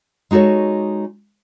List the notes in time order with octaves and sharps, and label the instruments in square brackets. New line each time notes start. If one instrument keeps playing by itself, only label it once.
[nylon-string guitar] G#3 D#4 F#4 A4 C#5